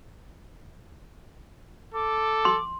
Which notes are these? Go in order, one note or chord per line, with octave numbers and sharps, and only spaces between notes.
A4 D6
C6